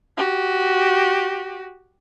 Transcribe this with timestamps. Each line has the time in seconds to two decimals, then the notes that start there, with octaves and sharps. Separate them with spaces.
0.17 F#4 G4